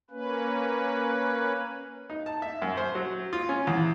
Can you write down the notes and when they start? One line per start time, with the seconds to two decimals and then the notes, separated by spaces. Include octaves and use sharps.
0.10 A#3 C#4 B4
2.10 D#4
2.26 A5
2.42 E5
2.62 F#2
2.77 C5
2.95 F#3
3.33 F4
3.49 C#4
3.67 E2